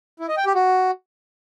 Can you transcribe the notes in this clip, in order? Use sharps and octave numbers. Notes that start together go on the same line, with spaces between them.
E4
D#5
G5
G4
F#4